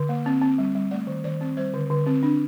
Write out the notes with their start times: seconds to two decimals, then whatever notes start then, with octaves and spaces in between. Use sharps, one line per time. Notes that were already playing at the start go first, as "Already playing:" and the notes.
Already playing: D3
0.09 A#3
0.26 C4
0.42 C4
0.58 G3
0.75 G3
0.91 A3 D5
1.07 D#3
1.24 D#3 D5
1.41 C4
1.57 G3 C5
1.74 D3
1.90 D3
2.06 C4
2.23 D4